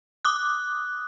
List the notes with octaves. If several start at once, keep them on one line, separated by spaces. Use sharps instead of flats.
D6 D#6 F#6